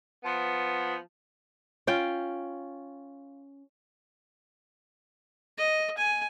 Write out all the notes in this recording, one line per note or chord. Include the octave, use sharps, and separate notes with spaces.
F3 B3
C#4 F4 G5
D#5
G#5